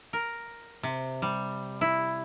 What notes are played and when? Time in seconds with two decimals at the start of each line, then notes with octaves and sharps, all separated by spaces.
0.13 A#4
0.83 C3
1.22 G3
1.81 E4